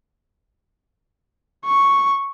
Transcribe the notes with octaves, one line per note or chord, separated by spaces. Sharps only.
C#6